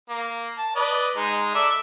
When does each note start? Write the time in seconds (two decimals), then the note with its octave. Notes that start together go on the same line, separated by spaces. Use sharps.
0.09 A#3
0.58 A5
0.76 B4 D5 D#5
1.17 G#3 D#4
1.55 A4 D5 E5